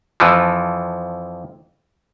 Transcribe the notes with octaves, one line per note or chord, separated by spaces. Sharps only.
F2 E3 F3